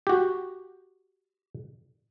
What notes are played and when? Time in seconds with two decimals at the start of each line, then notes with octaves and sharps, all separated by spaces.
0.07 F#4 G4